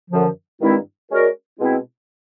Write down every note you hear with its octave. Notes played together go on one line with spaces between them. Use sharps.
F#2 D3 F3
G2 D#3 G#3 C4 E4
G#3 C#4 F#4 A#4 D5
B2 G#3 C4 E4